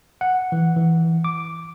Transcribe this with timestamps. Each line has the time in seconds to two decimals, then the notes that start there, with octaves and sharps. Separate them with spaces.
0.21 F#5
0.52 E3
0.77 E3
1.24 D6